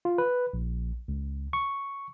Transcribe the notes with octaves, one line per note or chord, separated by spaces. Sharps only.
F4
B4
A#1
C#2
C#6